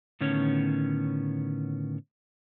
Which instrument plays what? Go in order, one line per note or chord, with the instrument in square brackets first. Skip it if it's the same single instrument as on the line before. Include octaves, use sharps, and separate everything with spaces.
[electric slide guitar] A2 D3 D#3 B3 C#4 C#5